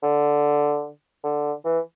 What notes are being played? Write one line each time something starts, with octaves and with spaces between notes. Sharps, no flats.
D3
D3
E3